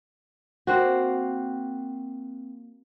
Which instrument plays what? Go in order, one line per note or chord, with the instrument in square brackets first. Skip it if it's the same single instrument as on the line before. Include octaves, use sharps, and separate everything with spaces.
[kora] A#3 C4 F#4